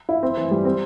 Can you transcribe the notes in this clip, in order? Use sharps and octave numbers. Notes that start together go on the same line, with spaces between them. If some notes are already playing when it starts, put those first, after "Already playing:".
E4
C4
E3
G3
C4